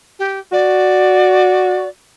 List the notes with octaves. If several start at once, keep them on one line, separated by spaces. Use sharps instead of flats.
G4
F#4 D5